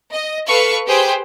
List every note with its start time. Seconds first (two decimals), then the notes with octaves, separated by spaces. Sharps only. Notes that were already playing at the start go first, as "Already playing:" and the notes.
0.12 D#5
0.46 A4 B4 F5 C#6
0.87 G4 G#4 B4 C5 G5